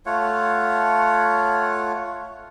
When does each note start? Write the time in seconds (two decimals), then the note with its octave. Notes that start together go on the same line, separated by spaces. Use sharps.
0.06 A3 F4 C#5 F#5